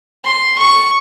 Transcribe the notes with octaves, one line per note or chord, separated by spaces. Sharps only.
C6
C#6